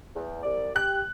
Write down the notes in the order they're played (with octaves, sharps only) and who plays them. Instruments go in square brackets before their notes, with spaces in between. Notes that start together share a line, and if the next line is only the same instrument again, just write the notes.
[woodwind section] E2
C2 D5
[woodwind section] G4 [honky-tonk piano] F#6